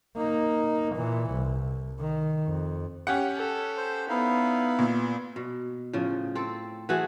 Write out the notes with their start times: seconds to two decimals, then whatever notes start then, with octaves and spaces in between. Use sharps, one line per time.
0.16 A#3 D#4
0.96 A#2 E3
1.31 C2
2.00 D#3
2.47 F2
3.07 C#4 G4 F#5
3.36 A4
3.77 C5
4.09 B3 D#4 E4 F5
4.79 A#2
5.36 B2
5.93 A2 C#3 F3
6.35 C4 A4
6.89 E3 A3 F#4 G#4